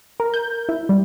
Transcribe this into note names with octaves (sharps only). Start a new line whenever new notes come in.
A#4
G6
E4
G3